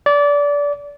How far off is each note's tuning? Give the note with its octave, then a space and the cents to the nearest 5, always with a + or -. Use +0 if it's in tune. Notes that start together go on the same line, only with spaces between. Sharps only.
D5 -25